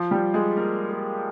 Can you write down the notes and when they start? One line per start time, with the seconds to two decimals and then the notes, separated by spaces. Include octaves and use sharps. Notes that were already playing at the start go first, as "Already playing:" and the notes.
Already playing: F3 F4
0.11 G3 G4
0.34 G#3 G#4
0.56 A#3 A#4
0.90 A#3 A#4